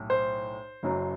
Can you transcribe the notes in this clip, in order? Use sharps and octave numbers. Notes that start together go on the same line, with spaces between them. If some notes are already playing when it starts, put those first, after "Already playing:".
Already playing: B1 A2
C5
F#1 F#2 F#3